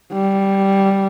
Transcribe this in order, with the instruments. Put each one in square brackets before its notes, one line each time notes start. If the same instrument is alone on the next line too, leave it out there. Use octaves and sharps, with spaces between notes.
[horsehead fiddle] G3